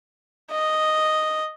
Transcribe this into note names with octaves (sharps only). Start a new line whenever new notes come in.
D#5